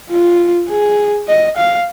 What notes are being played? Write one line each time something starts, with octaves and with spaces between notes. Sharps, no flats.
F4
G#4
D#5
F5